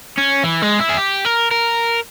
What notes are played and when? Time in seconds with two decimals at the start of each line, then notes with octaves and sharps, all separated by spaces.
0.18 C#4
0.44 E3
0.62 G#3
0.80 E4
0.89 G#4
0.97 G4
1.25 A#4
1.51 A#4